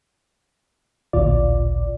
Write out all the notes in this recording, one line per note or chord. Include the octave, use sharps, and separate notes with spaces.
A1 D2 A#2 F4 D5